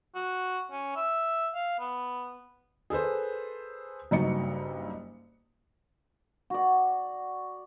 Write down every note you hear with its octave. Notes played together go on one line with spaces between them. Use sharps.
F#4
C#4
E5
F5
B3
G#4 A4 B4 C5
F#1 G2 D#4 F#4 C#7
F#4 D5